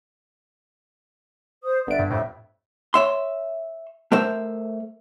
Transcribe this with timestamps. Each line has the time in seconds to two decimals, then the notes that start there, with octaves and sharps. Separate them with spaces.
1.63 C5 D#6
1.87 G1 B4 D5 E5 D7
1.99 G2
2.10 F2 A2 E5
2.94 C#5 E5 C6
4.12 A3 A#4 C5 E5